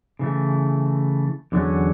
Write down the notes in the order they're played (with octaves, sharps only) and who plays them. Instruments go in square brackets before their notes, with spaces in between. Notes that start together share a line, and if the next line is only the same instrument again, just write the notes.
[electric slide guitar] C#3 E3 A3
E2 D3 F#3 A3 C#4